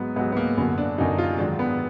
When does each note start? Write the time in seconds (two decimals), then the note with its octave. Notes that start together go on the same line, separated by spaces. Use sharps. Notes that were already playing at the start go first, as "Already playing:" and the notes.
Already playing: G#2 F#3 B3
0.16 G#2 B3
0.20 F#3
0.32 B3
0.37 A#3
0.58 F#2 D3 F#3 B3
0.78 D4
0.98 F#2 D3 F#3 D#4
1.18 F4
1.38 G#2 D#3 F#3 D4
1.59 B3